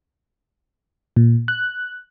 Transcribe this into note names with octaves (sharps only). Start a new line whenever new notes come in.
A#2
F#6